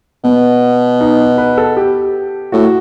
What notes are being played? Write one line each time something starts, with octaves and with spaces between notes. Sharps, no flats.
B2 B3
D#4
B4
B4
A4
G4
A2 F#4